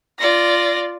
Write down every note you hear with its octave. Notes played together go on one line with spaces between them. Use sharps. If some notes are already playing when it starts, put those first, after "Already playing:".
F4 D5 A#6